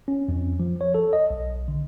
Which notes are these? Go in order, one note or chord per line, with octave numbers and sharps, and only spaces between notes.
C#4
F2
F3
C#5
A4
D#5
B1
D3